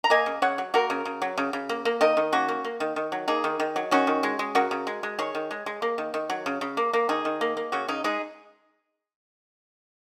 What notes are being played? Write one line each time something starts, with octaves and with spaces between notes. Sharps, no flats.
A#5
A#3 D#5 G#5
C#3
C#3 C#5 F#5
F#3
A#3 F#4 A#4
C#3
C#3
F#3
C#3
C#3
A#3
A#3
D#3 A#4 D#5
D#3
A#3 C#4 F#4
A#3
A#3
D#3
D#3
F#3
A#3 D#4 G#4
D#3
D#3
F#3
D#3 C#4 F#4
D#3
G#3
G#3
C#3 F#4 A#4
C#3
G#3
G#3
D#3 G#4 C#5
D#3
G#3
G#3
A#3
D#3
D#3
F#3
C#3
C#3
A#3
A#3
D#3 D#4 G#4
D#3
A#3
A#3
C#3 C#4 F#4
C#3 D#4
G#3 D#4 G#4